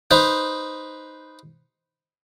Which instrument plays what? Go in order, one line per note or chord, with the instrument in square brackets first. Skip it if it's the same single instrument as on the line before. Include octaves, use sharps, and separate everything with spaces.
[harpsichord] D#4 B4 C5